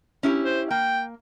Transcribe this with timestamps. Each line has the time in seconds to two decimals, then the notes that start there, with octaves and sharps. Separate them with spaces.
0.23 C#4 E4 G4
0.44 C5
0.71 A#3 G5